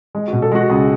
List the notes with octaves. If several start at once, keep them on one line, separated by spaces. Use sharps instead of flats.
G#3
F#4
B2
A4
G#3 F#4
C#2 G#4